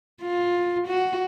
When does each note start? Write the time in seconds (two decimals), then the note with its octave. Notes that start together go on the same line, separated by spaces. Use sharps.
0.22 F4
0.87 F#4